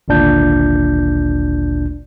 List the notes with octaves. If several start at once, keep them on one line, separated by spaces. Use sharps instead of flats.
G#1 D2 A#2 D4 G6